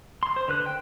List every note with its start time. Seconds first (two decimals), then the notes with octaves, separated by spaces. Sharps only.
0.23 C6
0.36 C5
0.48 D3 B4 F#6
0.66 G5